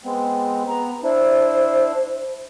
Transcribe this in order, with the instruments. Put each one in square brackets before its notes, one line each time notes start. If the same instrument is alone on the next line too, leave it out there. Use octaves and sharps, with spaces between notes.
[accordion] G#3 B3 C4
[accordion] B3 [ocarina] A#5
[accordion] D4 E4 [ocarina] C5